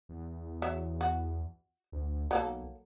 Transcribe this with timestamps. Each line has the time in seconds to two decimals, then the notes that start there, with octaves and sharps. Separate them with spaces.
0.09 E2
0.62 F#3 E5
1.01 F#4
1.92 D2
2.31 B1 F#3 A#3 A4